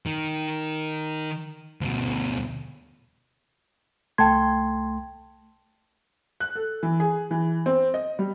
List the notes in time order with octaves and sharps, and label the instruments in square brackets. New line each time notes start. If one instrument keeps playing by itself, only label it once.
[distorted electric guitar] D#3
D2 B2
[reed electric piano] C2 A3 C6 [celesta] G5 A5 G#6
[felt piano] F#6
A4
E3
G#4
E3
C4
D#5
G3